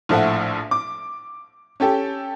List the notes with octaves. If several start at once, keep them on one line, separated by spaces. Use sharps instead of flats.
A#1 A2 F3 A4 E5 F#5
D6
C#4 G4 A4 G5